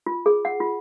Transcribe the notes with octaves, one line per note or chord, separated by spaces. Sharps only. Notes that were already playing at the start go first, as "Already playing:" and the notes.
F4
G#4
F#5
F4